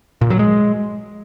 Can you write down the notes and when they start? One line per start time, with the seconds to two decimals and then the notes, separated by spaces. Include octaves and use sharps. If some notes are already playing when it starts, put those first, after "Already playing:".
0.21 A#2
0.30 F#3
0.39 G#3